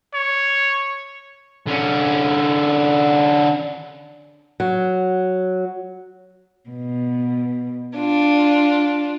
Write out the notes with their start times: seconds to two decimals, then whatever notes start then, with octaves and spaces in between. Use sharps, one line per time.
0.14 C#5
1.67 D3 C#4
4.60 F#3
6.69 B2
7.97 D4 F4